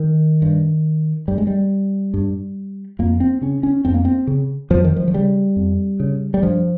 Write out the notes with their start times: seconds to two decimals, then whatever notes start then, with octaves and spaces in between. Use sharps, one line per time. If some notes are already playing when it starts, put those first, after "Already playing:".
Already playing: D#3
0.42 G2
1.28 G2 G3
1.38 G#3
1.47 G3
2.14 G2
2.99 F2 A#3
3.20 C4
3.41 C#3 C#4
3.63 C#4
3.85 F2 C4
3.94 A#3
4.05 C4
4.27 C#3
4.70 F2 F3
4.84 D#3
4.96 F3
5.08 F3
5.14 C#3 G3
5.56 F2
6.00 C#3
6.34 G3
6.43 G2 F3